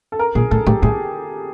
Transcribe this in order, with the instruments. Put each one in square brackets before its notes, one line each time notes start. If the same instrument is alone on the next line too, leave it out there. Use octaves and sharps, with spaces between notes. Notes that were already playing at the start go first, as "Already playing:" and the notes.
[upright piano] A4
A#4
[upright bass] A#2 [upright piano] G#4
[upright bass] A2 [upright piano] A4
[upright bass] A2 [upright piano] G4
[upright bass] A2 [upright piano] G#4